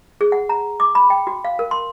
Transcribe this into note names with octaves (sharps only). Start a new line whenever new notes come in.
G#4
F#5
A#5
D6
B5
G5
F#4
F5
A#4
C6